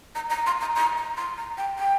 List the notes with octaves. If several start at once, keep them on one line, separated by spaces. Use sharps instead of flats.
A#5
A#5
C6
A#5
A#5
A#5
C6
A#5
G5
G5